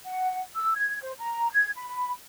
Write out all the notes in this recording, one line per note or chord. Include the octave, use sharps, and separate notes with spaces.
F#5
E6
G#6
C5
A#5
G#6
B5